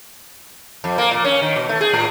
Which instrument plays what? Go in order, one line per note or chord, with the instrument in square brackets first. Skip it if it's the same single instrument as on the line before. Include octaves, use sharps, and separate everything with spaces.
[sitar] F2
A#3
A#2
C#4
D#3
B2
A3
G#4
A2